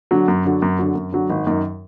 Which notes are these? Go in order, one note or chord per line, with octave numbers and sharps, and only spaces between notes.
D3 F#3
F#2
D3 F#3
F#2
D3 F#3
F#2
D3 F#3
G#1
F#2 D#3